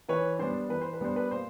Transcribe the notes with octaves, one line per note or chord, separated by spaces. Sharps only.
E3 B4 C#5
G3 B3 D4 C5
E3 B4
C5
B4
G3 B3 D4 C5
B4
A#2 C5